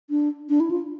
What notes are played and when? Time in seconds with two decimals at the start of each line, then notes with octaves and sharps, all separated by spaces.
0.10 D4
0.49 D4
0.60 E4
0.71 F4